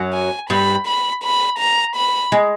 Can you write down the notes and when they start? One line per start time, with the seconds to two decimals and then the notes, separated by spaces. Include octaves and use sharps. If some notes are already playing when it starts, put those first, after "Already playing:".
Already playing: F#2 F#3
0.14 G#5
0.50 G2 G3 B5
0.87 B5
1.24 B5
1.59 A#5
1.96 B5
2.32 G#3